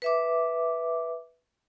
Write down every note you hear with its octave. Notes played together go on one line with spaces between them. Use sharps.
B4 E5 D6